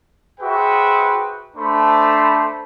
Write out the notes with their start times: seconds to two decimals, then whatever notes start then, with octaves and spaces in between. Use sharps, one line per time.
0.40 F#4 G#4 B4 C5 E5 G5
1.57 A3 D4 A4 C5 B5